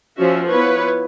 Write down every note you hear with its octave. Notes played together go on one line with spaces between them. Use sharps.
F3 C#4 F#4 E5
B3 E4 F4 B4 C#5